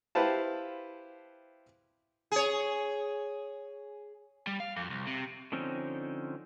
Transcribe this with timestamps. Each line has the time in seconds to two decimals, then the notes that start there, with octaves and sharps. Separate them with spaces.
0.15 E4 G4 B4 C5 F5 A5
2.32 G#4 C#5
4.47 G3
4.60 F5
4.76 F2
4.90 C2
5.07 C3
5.52 D3 F3 C4 C#4 D#4